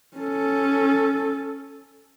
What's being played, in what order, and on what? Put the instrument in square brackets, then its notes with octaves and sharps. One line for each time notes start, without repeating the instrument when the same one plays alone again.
[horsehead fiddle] C#4 A4